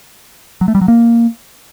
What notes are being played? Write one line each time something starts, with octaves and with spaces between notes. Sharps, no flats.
F#3
A3
G3
F#3
A#3